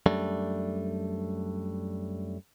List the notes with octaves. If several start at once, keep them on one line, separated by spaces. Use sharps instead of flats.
F#2 G3 A3 D4